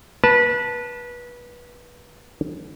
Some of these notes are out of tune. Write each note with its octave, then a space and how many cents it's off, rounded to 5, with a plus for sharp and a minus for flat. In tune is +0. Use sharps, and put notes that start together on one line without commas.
B4 -25 A5 +0